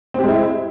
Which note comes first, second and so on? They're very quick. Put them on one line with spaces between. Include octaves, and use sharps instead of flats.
C4 G4 G#3 E4